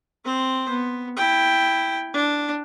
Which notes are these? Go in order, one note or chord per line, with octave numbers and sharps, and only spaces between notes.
C4 C5
B3
E4 G5
D4